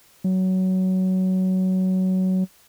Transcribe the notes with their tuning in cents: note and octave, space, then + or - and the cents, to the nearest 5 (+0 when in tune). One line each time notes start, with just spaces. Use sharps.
F#3 +15